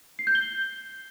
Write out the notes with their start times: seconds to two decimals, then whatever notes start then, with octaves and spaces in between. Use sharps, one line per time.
0.19 C7
0.27 G6
0.35 G7